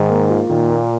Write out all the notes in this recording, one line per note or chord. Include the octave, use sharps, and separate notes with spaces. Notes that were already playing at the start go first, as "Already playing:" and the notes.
Already playing: G#2 D#3
A#3
F4
A#2 D#3
A#3